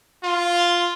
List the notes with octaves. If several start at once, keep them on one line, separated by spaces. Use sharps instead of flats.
F4